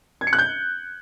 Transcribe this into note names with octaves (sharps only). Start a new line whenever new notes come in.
G#6
C#7
F#6
G6